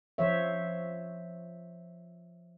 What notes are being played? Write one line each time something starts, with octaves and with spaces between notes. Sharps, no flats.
F3 C5 C#5 E5